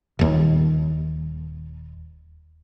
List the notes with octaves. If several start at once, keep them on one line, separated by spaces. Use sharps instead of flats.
D#1 D#2